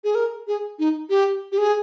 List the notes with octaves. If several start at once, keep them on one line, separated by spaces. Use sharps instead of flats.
G#4
A#4
G#4
D#4
G4
G4
G#4